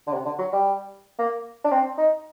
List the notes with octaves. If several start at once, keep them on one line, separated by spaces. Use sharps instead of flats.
D3
C3
D3
F#3
G3
A#3
D4
C4
D#4